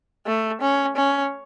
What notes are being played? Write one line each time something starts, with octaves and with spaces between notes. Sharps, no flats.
A3
C#4
C#4